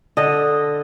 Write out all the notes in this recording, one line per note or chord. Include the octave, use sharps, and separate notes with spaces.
D3 A4 D#5